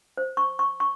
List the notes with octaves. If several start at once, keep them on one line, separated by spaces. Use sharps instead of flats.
C5
C#6
C#6
C#6